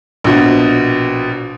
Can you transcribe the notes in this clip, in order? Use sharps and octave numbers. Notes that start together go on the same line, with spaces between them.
A#1 B2